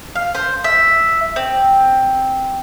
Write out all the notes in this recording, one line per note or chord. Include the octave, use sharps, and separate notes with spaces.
F5
C5
E5
C4